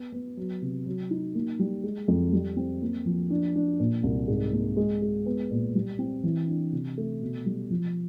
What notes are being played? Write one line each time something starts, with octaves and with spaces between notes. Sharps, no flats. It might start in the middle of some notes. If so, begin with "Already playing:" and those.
Already playing: B3
B3
F#3
C3
F#3
D#4
A#3
G3
G#3
F2
G3
C4
A#3
F3
D4
D4
A#2
C2
G#2
A#3
G#3
G#3
B3
A#2
G3
C4
E3
D4
C3
A3
B2
G3
F3